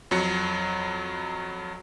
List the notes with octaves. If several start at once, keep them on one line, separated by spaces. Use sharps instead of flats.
F2 F#3 C#7